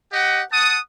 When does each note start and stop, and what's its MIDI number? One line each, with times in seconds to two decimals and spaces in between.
0.11 0.41 67
0.11 0.41 75
0.11 0.41 78
0.52 0.76 78
0.52 0.76 81
0.52 0.76 87